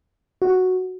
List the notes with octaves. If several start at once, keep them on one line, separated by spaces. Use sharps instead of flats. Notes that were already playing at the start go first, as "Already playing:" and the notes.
F#4